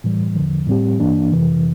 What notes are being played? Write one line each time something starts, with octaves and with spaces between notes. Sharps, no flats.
A2 E3 G3
E2 D3 F3
A2 G3 C4 G4
G2 E3 A#3 D4
F2 C3 E3